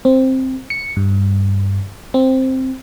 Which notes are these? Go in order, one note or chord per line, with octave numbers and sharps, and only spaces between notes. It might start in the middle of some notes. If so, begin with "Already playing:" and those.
C4
C#7
G2
C4